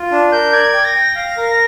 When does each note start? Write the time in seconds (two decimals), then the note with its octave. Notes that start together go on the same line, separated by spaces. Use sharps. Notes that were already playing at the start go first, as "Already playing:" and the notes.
Already playing: F4
0.11 D4
0.32 A#4 G6
0.52 D5 G#6
0.73 G5
0.84 A#6
0.95 G5
1.15 F5 A#6
1.37 A#4